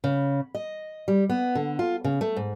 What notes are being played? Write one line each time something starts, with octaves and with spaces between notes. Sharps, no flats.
C#3
D#5
G3
B3
D3
F4
C#3
A3
G#2